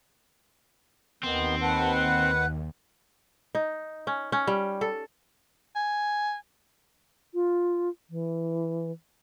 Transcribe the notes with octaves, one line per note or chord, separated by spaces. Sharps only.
D#2 D#3 B3 C4
D#3 B4 F#5 A5
F#6
D#4
C#4
C#4
G3
A4
G#5
F4
E3